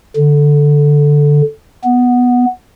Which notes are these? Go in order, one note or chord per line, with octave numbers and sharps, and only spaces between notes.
D3
B3